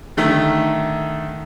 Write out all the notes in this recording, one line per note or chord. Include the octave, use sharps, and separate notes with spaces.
D3 D#3 A3